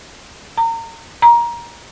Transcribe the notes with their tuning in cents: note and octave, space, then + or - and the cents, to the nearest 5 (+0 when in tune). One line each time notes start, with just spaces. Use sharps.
A#5 -30
A#5 +20